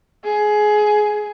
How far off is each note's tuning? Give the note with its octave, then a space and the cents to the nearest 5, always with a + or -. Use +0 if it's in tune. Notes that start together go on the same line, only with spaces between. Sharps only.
G#4 +15